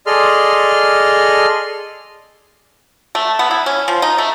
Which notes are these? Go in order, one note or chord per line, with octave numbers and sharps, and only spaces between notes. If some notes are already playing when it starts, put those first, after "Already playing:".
G#4 A4 D5 D#5 C6 F6
A3
B3
E4
C#4
F3
D#4
A3